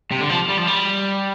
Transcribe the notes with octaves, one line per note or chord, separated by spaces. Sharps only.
C3
D3
F3
G3
F3
G3